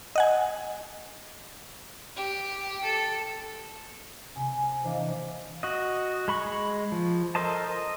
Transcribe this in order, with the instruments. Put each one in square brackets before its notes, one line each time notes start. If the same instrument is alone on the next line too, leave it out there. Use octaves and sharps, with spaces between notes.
[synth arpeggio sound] D#5 F#5 G#5
[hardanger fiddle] G4
A4
[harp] C3 [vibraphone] G#5
[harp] E3 A#3 D4 [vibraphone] C5 D#5 F5
[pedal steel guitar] F#4 D#5
G#3 B5 C#6
F3
A4 A#4 C5 D#5 A5
D#5